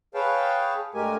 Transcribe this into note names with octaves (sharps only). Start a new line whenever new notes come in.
G#4 B4 C#5 F5 G5 A5
G2 G#3 A3 G4 A#4 G#5